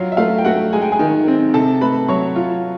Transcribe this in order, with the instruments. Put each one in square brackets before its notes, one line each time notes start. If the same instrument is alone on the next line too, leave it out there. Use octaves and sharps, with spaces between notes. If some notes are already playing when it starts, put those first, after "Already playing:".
Already playing: [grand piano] F#3 [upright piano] F4 F5
[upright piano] E5
[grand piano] A3 [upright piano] F4 F5
[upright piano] G5
[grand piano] A3 [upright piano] F#4 F#5
[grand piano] G#3 [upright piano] G#5
[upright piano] G5
G#4 G#5
[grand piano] D#3
C4
[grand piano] C3 [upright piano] A4 A5
[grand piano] A3 [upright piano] B4 B5
[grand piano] F#3 [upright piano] C#5 C#6
[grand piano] F4